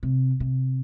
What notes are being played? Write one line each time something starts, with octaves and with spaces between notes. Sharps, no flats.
C3
C3